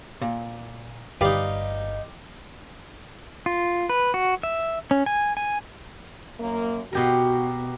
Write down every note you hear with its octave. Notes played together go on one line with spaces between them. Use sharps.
A#2
G1 D#4 G4 B4 D5 F5
F4
B4
F#4
E5
C#4
G#5
G#5
F#2 A#3
B2 F#4 G4 A#4